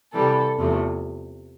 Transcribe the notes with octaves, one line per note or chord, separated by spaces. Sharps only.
C3 E3 G3 A4
E2 C3 F3 A3